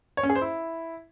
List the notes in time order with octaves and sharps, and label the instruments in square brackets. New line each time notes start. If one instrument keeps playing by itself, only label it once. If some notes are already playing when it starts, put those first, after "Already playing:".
[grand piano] C#5
C#4
G#4
C5
E4